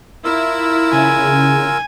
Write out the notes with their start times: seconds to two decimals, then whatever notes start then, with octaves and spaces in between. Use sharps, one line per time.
0.25 E4 F4 A#4 E6
0.92 C#3 G#5